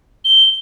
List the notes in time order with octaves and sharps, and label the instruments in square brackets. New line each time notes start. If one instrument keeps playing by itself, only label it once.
[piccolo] G7